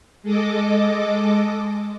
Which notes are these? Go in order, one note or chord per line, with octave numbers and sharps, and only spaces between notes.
G#3 A4 D#5 D6